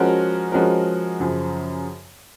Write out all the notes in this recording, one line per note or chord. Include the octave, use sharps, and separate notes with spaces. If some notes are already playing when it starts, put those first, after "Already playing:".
Already playing: F3 G#3 C#4 F#4 A#4
F3 G#3 C#4 F#4 A#4
F#2 C#3 F3